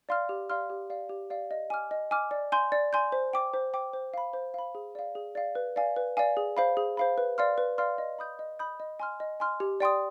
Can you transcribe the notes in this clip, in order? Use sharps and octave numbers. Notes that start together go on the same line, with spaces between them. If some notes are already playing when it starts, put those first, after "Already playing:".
D5 F5 C6 F6
G4
D5 F5 C6 F6
G4
D5 F5
G4
D5 F5
D#5
G#5 D6 F6
D#5
G#5 D6 F6
D5
G#5 C6 G6
D5
G#5 C6 G6
C5
G5 D6
C5
G5 D6
C5
F5 B5
C5
F5 B5
G#4
D5 F5
G#4
D5 F5
B4
D5 F5 G#5
B4
D5 F5 G#5
G#4
C5 F5 B5
G#4
C5 F5 B5
B4
D5 F5 C6 F6
B4
D5 F5 C6 F6
D#5
B5 D#6 G6
D#5
B5 D#6 G6
D#5
G#5 C6 F6
D#5
G#5 C6 F6
G4
D5 G5 C6 D#6